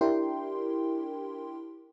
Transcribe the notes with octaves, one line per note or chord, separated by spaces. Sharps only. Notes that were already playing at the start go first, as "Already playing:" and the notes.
D4 E4 G4 A#4 G5 C6